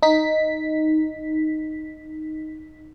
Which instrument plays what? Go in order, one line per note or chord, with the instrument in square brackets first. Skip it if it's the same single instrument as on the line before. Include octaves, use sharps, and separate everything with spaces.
[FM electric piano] D#4 B6